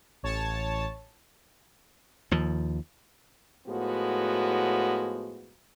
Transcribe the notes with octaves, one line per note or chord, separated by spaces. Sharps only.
A1 C#5 A5
D#2 F3
A2 F3 G#3 B3 F#4